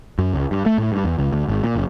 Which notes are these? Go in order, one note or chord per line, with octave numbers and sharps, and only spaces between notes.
F#2
C#2
G2
A3
A2
G2
E2
C#2
D2
G#1
A#2
F#1